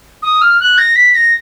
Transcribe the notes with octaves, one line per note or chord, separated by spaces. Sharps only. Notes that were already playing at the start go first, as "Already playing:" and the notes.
D#6
F6
F#6
A#6
B6
A#6